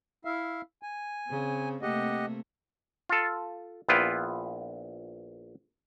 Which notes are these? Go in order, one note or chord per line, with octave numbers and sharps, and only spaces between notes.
E4 E5 F5
G#5
C#3 C4
C3 A3 A#3 G4 D#5 F#5
F4 A4
A#1 B3 E4 F4 B4 G5